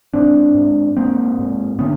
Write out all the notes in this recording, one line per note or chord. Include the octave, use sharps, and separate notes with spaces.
G#2 C4 D4
G#2
G#2 A#3 C4
G#2
D3 B3 C#4